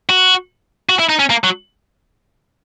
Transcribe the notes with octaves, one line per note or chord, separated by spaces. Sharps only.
F#4
F#4
E4
D#4
C#4
A#3
F#3